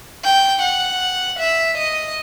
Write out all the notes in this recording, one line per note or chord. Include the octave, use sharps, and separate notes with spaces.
G5
F#5
E5
D#5